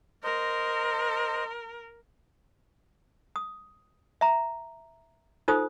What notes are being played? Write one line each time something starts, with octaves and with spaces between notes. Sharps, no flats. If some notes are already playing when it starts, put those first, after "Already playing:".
A#4 C5 D#5
D#6
E5 A#5
D#4 F4 A4 C5 D#6